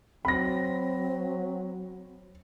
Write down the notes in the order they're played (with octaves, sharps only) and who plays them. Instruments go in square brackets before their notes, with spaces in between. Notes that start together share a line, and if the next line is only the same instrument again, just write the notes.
[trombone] F#3 [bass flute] C4 [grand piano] B5 A#6